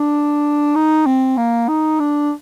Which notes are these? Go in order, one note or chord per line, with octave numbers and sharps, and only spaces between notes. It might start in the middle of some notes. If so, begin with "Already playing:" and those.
Already playing: D4
D#4
C4
A#3
D#4
D4